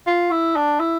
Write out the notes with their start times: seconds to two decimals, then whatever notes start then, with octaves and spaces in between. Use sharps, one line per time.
0.07 F4
0.31 E4
0.56 D4
0.80 E4